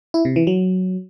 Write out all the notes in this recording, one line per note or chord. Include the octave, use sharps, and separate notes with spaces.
E4
C3
E3
F#3